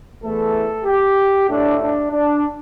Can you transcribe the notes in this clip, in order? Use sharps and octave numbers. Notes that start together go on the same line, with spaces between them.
E2 E3 A3 A4
G4
A2 A3 D4
D4
D4